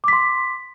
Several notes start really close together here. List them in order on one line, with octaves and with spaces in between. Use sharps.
D6 B6 C6